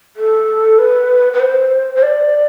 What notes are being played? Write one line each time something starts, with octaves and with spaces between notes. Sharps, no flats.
A4
B4
B4
C5
C5
D5